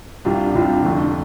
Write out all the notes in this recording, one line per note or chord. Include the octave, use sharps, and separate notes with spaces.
C2 C3 G3 D4 F4
C2 C3 G3 D4 F4
F2 D3 A3